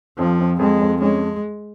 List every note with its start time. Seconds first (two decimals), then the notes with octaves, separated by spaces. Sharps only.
0.18 F2 F3
0.39 F2
0.59 F2 G#3
0.81 F2
1.01 G#3 C#4